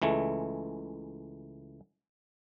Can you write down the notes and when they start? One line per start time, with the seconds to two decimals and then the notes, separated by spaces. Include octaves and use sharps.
0.02 C#2 E3 G#3 A3